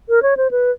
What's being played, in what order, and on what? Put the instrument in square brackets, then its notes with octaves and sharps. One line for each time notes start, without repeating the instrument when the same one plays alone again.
[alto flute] A#4
C#5
C5
B4